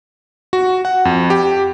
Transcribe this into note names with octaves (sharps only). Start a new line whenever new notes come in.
F#4
F#5
F2
G4